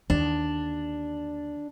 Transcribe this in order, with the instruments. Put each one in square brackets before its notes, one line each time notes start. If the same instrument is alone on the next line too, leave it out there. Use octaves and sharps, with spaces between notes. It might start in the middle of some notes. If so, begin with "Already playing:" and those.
[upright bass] D#2 D3 [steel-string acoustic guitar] D4